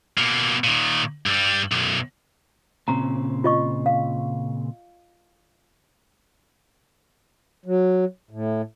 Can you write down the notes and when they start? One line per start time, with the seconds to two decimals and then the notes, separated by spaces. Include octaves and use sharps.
0.18 B2 A#3
0.64 A#2 D#3
1.26 G2 G3
1.72 B1 F#2
2.88 A#2 C#3 C4 A#5
3.44 F4 D#5 C#6
3.86 F5
7.66 F#3
8.31 A2